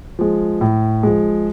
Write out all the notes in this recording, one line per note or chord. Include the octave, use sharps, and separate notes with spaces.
F3 G#3
A2
F3 G#3